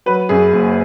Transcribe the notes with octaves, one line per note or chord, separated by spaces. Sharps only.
F#3 B4
F#2 G#4
F#1